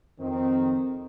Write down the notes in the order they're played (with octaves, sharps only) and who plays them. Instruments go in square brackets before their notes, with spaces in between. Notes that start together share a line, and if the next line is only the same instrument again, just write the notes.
[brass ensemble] F2 D#3 C4